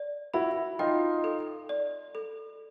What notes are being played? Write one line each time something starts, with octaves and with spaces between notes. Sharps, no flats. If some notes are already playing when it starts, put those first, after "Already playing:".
Already playing: D5
E4 F#4 B5
D#4 F4 G5
A4
D5
A4